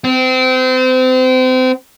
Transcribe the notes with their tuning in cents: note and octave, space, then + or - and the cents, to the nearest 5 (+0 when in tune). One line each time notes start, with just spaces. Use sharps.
C4 -30